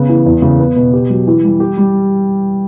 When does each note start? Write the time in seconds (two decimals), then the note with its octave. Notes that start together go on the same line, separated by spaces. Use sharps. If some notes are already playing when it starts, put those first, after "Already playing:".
Already playing: C#3 B3
0.09 E3
0.26 E2
0.42 C#3
0.59 B3
0.75 B2
0.93 G4
1.10 F#3
1.27 E3
1.43 G3
1.60 G4
1.77 G3